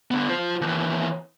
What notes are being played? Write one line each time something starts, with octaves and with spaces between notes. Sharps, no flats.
D3 B3
F4 C5
D#2 E3